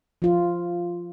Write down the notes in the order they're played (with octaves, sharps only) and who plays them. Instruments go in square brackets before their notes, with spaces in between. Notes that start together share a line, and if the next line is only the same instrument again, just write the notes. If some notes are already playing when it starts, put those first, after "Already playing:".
[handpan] F3 F4